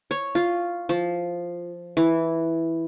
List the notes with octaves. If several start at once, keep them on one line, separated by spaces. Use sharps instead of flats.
C#5
F4
F3
E3